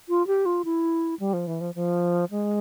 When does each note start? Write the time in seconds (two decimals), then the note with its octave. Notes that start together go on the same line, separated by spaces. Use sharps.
0.09 F4
0.27 G4
0.46 F4
0.65 E4
1.20 G3
1.33 F3
1.47 E3
1.61 F3
1.75 F3
2.31 G#3